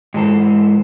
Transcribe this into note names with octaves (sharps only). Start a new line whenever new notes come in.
G#2 E3 A4 C5